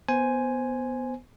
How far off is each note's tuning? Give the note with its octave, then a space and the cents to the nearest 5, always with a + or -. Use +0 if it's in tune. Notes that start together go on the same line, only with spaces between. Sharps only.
B3 +0 C5 +0 G#5 +0